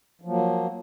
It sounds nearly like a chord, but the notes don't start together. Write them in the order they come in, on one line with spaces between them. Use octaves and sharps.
F3 F#3 A#3